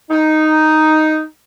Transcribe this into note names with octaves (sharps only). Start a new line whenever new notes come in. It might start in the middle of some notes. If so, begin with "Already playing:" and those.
D#4